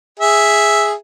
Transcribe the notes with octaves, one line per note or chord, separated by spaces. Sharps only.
G#4 E5